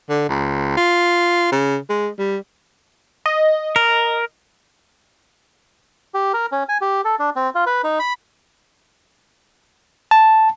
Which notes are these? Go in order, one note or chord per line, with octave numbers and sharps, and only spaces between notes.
D3
C#2
F4
C#3
G#3
G3
D#5
A#4
G4
A#4
C#4
G#5
G4
A4
D4
C4
F4
B4
D#4
B5
A5